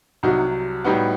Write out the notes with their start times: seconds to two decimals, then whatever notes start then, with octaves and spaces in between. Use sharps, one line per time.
0.23 C2 C3 F#3 D#4 F#4
0.85 A2 G3 B3 D#4 F#4